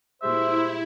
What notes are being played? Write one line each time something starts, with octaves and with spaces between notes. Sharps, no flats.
A#2 G3 G#3 E4 C5 E5